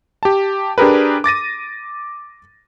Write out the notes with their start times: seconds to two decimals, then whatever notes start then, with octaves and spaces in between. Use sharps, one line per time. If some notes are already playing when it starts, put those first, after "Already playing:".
0.23 G4 A5
0.78 D4 G4 G#4 A#4 B4
1.24 D6 A6 A#6 D#7